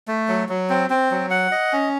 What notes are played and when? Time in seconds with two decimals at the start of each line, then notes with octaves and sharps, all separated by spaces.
0.08 A3
0.28 F#3
0.49 F#3
0.70 C4
0.90 C4
1.11 F#3
1.31 F#5
1.52 D#5
1.73 C#4